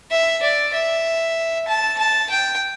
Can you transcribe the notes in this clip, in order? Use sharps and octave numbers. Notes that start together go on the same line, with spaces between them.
E5
D5
E5
A5
A5
G5